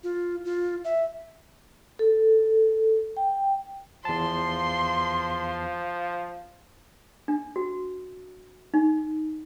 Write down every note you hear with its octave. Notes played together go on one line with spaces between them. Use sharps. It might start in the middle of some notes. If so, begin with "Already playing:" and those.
F4
F4
E5
A4
G5
E2 F3 A5 C6
D4
F#4
D#4